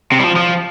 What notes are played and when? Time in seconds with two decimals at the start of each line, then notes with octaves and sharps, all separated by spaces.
0.12 C3
0.19 G3
0.24 F3
0.36 F3